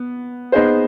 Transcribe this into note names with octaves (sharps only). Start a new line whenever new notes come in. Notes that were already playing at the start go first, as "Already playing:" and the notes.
Already playing: B3
B3 D#4 G#4 C5